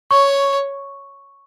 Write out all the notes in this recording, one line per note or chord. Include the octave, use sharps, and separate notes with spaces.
C#5 C#6